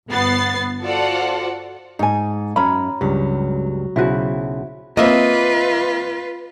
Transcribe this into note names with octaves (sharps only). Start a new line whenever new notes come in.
G1 B3 A6 C7
F4 F#4 A4 C5 D5 F#5
G#2 D#4 G#5
F#2 C#4 A#5 B5
C#2 G2 F#3
B1 C#3 E4 F#4 C5
A#3 C4 F4 B4 D#5 E5